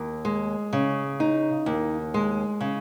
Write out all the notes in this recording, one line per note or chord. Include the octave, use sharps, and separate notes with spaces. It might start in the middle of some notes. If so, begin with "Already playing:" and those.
Already playing: D#2
G#3
C#3
D#4
D#2
G#3
C#3